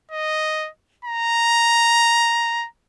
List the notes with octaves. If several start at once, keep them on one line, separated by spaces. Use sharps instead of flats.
D#5
A#5